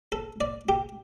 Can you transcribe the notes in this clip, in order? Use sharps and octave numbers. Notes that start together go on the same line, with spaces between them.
A4
D5
G4